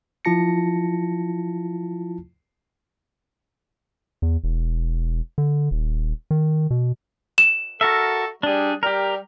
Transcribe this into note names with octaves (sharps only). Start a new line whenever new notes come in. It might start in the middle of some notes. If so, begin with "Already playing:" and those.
F3 E4 F4 A5 A#6 C#7
E2
E1
D3
D#1
D#3
B2
E7
F#4 A4 A#4 E5
G3 D4 G#4
G3 G4 A#4